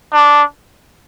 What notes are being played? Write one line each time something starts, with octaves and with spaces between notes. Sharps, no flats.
D4